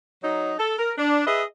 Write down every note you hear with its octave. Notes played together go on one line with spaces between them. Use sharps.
F#3 D#4
A4
A#4
D4
G#4 B4 D#5 E5